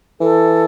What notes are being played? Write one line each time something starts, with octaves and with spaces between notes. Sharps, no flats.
E3 A4